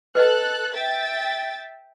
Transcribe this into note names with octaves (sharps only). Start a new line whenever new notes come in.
A4 B4 D#5 F#5 F#6
E5 G5 A6